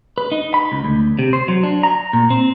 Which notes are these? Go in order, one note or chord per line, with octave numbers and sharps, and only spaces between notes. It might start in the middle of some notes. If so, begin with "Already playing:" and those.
B4
D#4
B5
C#2
D2
C3
C5
F#3
D4
A#5
A#2
C4